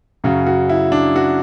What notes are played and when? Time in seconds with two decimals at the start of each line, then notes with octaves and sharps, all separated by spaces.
0.24 F#2 C#3 F#3 F#4
0.47 F#4
0.69 E4
0.92 D4
1.16 F#4